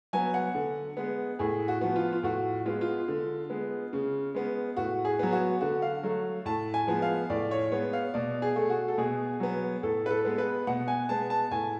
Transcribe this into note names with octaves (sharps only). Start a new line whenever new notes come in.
F#3 B3 G#5
F#5
D3
G#3 B3
A2 G#4
F#4
F3 B3
F4
F4
A2 F#4
G#3 B3 F4
F4
D3
G#3 B3
C#3
G#3 B3
A2 F#4
G#4
F#3 B3
F#4
D3 F#4
F5
F#3 A3
A2 A5
G#5
F3 G#3 B3
F5
A2 D5
C#5
G#3 B3 C#5
F5
B2 D5
G#4
A3
F#4
A4
B2 G#4
F#3 B3
A2 A4
B4
A4
G#3 B3
B4
B2 F#5
G#5
G#3 B3 A5
A5
A2 G#5